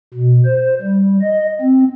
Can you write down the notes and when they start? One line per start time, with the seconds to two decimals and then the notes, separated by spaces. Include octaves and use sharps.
0.13 B2
0.45 C5
0.82 G3
1.21 D#5
1.61 C4